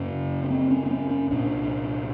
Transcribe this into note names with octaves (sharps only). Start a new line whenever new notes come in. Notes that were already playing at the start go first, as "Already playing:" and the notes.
Already playing: F#2 C#3 C#4
C#4
C4
C#4
C4
C#4
C#4
C2 A#2 D4